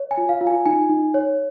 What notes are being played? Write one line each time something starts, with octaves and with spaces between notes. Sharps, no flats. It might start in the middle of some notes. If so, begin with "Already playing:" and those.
Already playing: C#5
G#5
F4
F5
F4
G#5
D#4 G#5
D#4
C#5